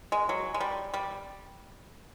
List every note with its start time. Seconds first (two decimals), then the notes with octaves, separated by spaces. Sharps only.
0.12 G#3
0.29 F#3
0.54 G#3
0.60 G3
0.94 G3